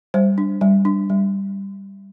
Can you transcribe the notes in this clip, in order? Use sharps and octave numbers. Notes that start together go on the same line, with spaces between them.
G3 C5
D4
G3
D4
G3